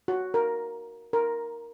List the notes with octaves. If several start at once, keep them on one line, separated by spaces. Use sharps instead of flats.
F#4
A#4
A#4